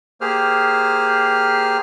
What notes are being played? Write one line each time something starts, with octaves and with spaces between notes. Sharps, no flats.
A#3 G4 G#4 C5 F6